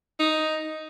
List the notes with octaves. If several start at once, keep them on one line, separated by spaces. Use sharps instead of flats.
D#4